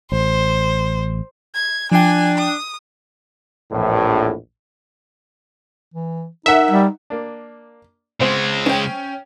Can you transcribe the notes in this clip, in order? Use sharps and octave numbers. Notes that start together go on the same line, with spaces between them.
A1 C5
G#6
F3 D4 G5 G#5
D#6
A#1 E2 A2
E3
D#4 A#4 E5 F#5
G3
A#3 D4
C#3 G#3 B3 C4 C5
C#4 G5